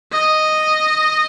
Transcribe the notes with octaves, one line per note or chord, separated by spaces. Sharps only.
D#5